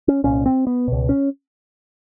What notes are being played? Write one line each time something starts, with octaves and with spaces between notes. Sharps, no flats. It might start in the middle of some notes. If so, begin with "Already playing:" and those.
C#4
C2 A#2 C#4
C4
B3
C#2 B2
C#4